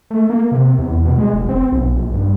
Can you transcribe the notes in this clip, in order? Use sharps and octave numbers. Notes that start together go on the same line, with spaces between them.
A3
A#3
C3
E2
B2
G#3
F1
C4
B1
A#1
G2